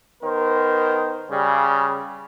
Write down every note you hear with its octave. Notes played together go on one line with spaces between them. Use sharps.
D#3 B3 A#4 C5
C#3 G3